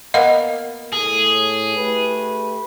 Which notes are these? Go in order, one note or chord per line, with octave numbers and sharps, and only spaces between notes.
A#3 B3 A#4 D#5
A2 G#4
A3 G4 B4